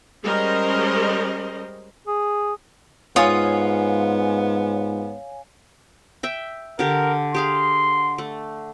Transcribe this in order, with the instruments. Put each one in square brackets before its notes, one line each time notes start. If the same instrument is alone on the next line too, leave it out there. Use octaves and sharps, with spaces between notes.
[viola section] G3 G#3 C#4 A#4 C5 D#5
[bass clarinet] G#4
[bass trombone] G#2 [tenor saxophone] B3 [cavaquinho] F4 D#6 [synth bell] C#5 F5 G#5
[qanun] E5 G5
[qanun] D3 G4 [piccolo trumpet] A#4
[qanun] G4 G#4 F5 [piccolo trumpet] C6
[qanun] A3